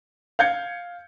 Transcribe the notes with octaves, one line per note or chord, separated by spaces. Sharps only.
F5 G6 G#6 C#7